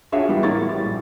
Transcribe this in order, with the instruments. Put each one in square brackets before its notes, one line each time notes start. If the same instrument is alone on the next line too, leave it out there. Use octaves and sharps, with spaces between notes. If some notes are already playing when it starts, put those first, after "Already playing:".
[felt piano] D4 F4 F#4 G#4 C#5 E5
E3 G3 G#3 B3 F#4
A1 A#3 E4 C#6 A6
G3
A#1